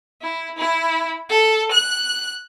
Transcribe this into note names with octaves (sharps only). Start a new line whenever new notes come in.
E4
E4
A4
F#6